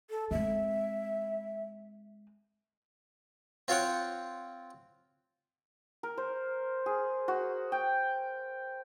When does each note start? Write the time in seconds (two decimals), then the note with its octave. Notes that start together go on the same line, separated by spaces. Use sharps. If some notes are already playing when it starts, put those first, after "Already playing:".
0.10 A4
0.31 G#3 C4 E5
3.68 C4 F4 C5 C#5 F#5 G5
6.03 A#4
6.17 C5
6.86 G#4
7.28 F#4
7.72 G5